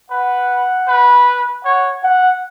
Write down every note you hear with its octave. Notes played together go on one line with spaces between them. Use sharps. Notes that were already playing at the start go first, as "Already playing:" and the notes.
B4 F#5
B4
C#5 F#5
F#5